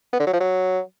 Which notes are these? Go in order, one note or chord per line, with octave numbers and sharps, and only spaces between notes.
B3
D3
F#3
F3
F#3